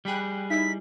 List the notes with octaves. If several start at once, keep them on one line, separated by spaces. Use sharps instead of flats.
G3 G#4 G5 B5 F#6
D#4 E4 B6